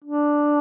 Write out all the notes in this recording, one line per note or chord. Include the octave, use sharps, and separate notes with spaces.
D4